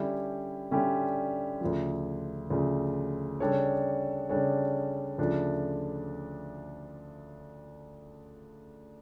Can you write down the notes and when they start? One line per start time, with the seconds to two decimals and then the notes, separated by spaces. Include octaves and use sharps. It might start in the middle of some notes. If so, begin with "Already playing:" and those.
Already playing: D3 G3 C#4 E4 G4
0.71 D3 G3 C#4 E4 G4
1.61 D2 C#3 F3
2.50 D2 C#3 F3
3.40 C#3 G3 D4 A4 C#5
4.29 C#3 G3 D4 A4 C#5
5.18 D2 C#3 F3 A3 D4